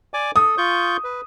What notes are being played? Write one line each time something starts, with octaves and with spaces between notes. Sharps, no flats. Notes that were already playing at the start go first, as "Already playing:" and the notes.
D5 G#5 D6
A4 D#6
F4 C#6 G6
B4